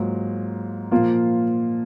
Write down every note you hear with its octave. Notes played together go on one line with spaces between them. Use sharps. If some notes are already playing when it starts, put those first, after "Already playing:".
Already playing: G#2 F#3 A#3 F4
A#2 F3 A#3 F4